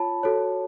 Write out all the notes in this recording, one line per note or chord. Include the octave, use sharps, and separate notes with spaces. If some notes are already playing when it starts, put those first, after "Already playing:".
Already playing: F4 C#5 A5 B5
F#4 A4 C#5